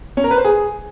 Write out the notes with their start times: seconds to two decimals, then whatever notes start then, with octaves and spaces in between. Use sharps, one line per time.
0.17 C#4
0.24 A#4
0.31 B4
0.38 C5
0.45 G#4